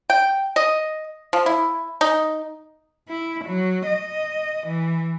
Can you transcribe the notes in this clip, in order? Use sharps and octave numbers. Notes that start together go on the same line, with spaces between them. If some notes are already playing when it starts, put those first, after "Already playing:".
G5
D#5
F3
E4
D#4
E4
F#3
D#5
E3